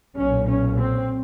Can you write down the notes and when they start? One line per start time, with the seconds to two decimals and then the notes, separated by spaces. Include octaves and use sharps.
0.16 B1 A#2 C#4
0.47 C#4
0.78 C4